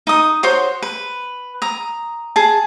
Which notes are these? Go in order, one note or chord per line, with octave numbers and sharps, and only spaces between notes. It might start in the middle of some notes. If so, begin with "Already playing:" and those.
D#4 D#6
F#4 C5 C#5 C6
B4
A#5 D#6
G#4 A5